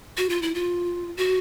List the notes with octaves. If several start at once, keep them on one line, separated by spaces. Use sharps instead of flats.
F#4
F4
E4
F4
F#4